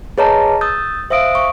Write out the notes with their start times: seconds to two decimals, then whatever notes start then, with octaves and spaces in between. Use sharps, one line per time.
0.18 G#4 B4 C#5 D#5 A5 A#5
0.61 D#6 E6 G6 A6
1.10 C5 E5 F5 D#6 E6 D7
1.35 C#6